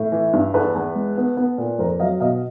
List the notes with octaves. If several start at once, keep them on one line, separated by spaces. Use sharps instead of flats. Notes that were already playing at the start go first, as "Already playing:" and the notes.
Already playing: A2
E3
G2
E2 A4 B4
E2
G#3
B3
B3
A#2
F2 A#4 C5
F#3 D#5 F5
B2 D#5 F5